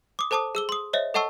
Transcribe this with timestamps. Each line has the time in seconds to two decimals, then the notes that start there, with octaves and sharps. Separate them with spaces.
0.19 D6 D#6
0.31 A4 C5 A5 D6 D#6
0.55 G#4 E6 G7
0.69 C6 D#6
0.93 C5 C#5 D#5 E5
1.14 A4 D#5 F#5 A5 C#6 E6